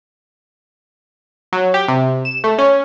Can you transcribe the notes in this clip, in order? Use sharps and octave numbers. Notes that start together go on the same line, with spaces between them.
F#3
G4
C3
E7
A3
C#4